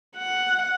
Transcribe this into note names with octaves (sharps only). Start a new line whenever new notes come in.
F#5